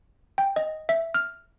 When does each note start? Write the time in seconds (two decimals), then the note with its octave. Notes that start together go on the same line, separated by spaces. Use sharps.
0.38 G5
0.56 D#5
0.89 E5
1.14 F6